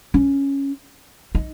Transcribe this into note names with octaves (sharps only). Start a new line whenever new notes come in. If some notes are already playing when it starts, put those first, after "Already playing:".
C#4
D#4